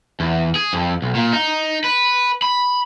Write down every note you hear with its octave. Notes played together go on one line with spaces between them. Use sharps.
E2
G#4
F2
B1
A#2
D#4
B4
B5